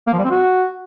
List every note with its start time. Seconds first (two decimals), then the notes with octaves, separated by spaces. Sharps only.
0.07 A#3
0.13 F3
0.19 G3
0.25 C4
0.30 F#4